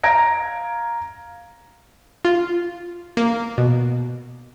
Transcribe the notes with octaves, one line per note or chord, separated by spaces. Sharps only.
F5 A#5 G#6 A#6 D7
F4
A#3
B2